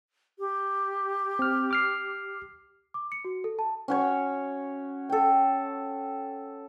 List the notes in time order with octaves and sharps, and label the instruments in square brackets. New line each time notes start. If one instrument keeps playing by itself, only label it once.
[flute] G4
[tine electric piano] C4 F6
D6 F6 C7
[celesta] D6
C#7
F#4
A4
A5
[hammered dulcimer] C#4 F#4 C#5
A4 G5